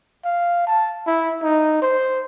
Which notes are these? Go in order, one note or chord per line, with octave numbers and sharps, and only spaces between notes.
F5
A5
E4
D#4
C5